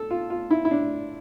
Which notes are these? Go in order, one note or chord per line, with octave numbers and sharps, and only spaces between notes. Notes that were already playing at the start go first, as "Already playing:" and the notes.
Already playing: A4
F4
F4
E4
E4
D4